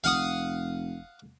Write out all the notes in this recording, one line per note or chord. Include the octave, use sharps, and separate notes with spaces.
F1 F5 F#5 D#6